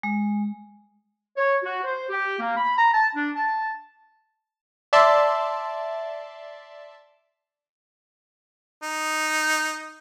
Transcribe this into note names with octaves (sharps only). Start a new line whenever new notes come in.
G#3
C#5
F#4
C5
G4
A#3
B5
A#5
A5
D4
A5
D5 E5 A5 C6
D#4